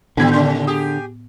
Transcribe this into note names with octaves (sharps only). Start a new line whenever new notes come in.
A2 D3 D#3 G3 B3 C4 G#6
D#2 C#3 C6 G6
G4 G#4 D#6